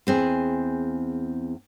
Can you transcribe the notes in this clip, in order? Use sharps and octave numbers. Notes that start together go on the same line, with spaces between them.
E2 C4 G#4